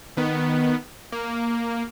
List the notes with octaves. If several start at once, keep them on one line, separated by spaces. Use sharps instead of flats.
D#3 B3
A#3